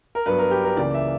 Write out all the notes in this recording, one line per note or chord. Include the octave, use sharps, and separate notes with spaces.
A#4
G2 F#3 B3 B4
A#4
G4
A#4
C#2 C#3 E3 A#3 D5
E5